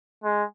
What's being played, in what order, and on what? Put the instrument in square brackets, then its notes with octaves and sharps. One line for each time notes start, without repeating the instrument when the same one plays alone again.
[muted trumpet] G#3